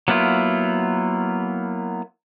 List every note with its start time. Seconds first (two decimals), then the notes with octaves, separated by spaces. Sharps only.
0.08 F#3 A#3 B3 E4 F4